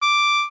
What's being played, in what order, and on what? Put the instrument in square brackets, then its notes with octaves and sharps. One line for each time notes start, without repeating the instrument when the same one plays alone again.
[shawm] D6